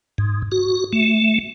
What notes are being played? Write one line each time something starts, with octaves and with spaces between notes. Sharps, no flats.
G#2
F#4
A3